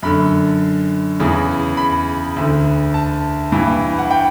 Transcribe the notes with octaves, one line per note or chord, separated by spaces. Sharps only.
F#2 D3 B5
E2 C#3 E3
B5
D2 D3
A5
G2 E3
F#5
G5